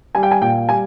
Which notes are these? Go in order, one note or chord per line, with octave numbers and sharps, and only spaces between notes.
G3 G#5
G5
G#5
A#2 G5
G3 G#5